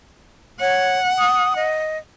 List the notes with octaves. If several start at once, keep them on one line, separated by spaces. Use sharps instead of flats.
C#5 F#5
D#6
D#5